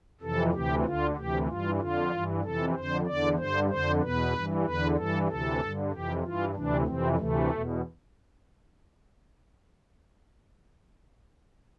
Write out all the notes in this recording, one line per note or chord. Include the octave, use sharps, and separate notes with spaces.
F2 C3 E3 A4
D2 C3 E3 G4
D2 D3 F4
D2 C3 E3 G4
G2 E3 F4
F2 D3 F4
G2 E3
F2 C3 E3 A4
F2 D3 C5
E2 D3 D5
G2 D3 C5
F2 D3 C5
E2 B2 B4
G2 E3
E2 D3 B4
G2 E3 A4
D2 C3 E3 A4
G2 D3
F2 C3 E3 G4
G2 E3 F4
D2 C3 E3 D4
F2 C3 E3 C4
D2 C3 E3 A3
E2 B2